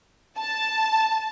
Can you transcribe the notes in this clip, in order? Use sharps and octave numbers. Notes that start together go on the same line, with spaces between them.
A5